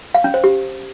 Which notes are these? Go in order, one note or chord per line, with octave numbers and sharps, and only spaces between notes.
F5
C#4
C5
G4